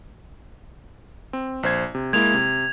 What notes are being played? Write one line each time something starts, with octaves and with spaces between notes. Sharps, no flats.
C4
A#1 C5 G#6
C3
G#3 A#3 E4 G#6 F7
C3